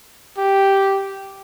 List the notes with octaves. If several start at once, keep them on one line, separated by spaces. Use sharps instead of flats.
G4